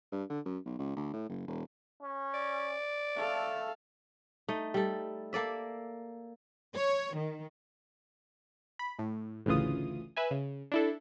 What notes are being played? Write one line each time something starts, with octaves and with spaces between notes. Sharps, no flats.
G2
D3
F#2
B1
C#2
D2
A2
F#1
E1
C#4
D5
A3 A4 F5
A3 D#4
G3 A4
A#3 A4 D5 E5
C#5
D#3
B5
A2
A1 D2 C#3 E3 F4 D#6
B4 E5 G#5
C#3
D4 E4 A4